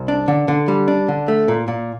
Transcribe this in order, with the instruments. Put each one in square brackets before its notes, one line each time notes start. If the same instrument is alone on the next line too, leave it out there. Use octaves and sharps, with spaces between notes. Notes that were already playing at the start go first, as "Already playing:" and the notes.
Already playing: [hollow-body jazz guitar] C2
D4
D3
D3
G3
D4
D3
A3
A#2
A#2